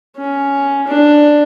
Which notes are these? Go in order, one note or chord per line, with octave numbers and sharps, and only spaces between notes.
C#4
D4